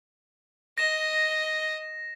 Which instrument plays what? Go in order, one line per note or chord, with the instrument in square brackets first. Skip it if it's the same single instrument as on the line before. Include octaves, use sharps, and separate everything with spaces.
[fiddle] D#5 [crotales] A#6 E7